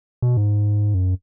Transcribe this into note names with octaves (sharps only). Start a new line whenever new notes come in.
B2
G#2
F#2